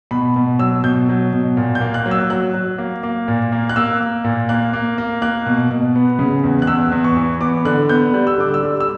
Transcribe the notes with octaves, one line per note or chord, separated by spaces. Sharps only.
B2 B5
B2
F#3 E6
B2 G6
F#3
B2
A#2
G6
A#3
F#6
F#3
E6
F#3 F#6
F#3
A#3
A#3
A#2
A#3
F#6
A#3 E6
A#3
A#2
A#3 F#6
A#3
A#3
A#3 F#6
B2
B2
B3
C#3
E2
F#6
E2 E6
E2
C#6
E3
B3 D6
D3 F#6
B3 G6
G3 F#6
E6
D3 D6
E6
G3
E6